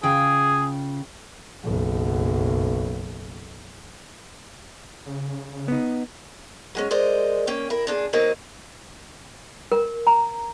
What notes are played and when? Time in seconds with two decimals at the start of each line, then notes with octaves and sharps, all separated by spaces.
0.03 C#3 F4 G#4 G5
1.64 F#1 B1
5.06 C#3
5.68 B3 D#4
6.75 F#3 G#3 C#4
6.91 G#3 A#4 C5 D5 D#5
7.47 A#3 C#4 G5
7.70 E4 A#4
7.87 A#2 D4 G#4
8.13 D#3 F#3 A#3 C4 D#4
9.72 A#4
10.07 A#5